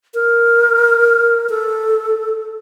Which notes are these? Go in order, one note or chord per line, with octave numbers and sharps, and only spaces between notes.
A#4
A4